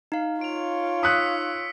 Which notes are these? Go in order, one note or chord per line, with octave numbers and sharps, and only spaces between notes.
D#4 F5
F4 C#5 D7 F7
D#6 E6 F#6 B6 C#7